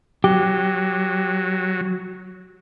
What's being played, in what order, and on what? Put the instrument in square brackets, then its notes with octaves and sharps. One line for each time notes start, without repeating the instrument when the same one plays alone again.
[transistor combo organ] F#3 [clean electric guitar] G4